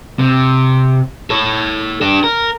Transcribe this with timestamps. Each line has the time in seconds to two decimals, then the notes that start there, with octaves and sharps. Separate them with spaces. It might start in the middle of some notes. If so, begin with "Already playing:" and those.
0.19 C3
1.30 A4 C#5
2.01 D4 G4
2.24 A#4